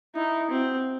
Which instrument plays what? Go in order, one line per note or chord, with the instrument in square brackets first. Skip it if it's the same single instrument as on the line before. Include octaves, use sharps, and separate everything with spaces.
[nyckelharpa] D#4 [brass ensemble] E4
[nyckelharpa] C4 [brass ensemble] F#4